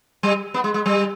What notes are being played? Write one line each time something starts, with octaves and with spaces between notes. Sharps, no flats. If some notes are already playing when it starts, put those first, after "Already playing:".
G3
B3
G#3
G#3
G3